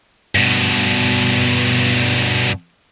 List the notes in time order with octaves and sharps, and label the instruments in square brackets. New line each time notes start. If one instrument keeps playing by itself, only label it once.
[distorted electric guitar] G2 B2